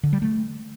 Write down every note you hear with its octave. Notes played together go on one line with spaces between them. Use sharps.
D3
G3
A3